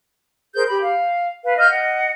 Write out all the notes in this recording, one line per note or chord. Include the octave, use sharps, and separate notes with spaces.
G#4 A#4 C5 G6
G4 B5
F5
B4 F5
D#5 F5 F6 G6
D#5 F#5